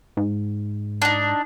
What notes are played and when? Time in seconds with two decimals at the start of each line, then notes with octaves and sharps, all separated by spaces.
0.17 G#2
1.02 D4 D#4